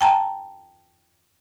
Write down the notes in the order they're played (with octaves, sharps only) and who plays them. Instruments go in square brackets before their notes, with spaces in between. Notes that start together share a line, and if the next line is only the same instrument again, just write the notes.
[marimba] G5 A5 A#5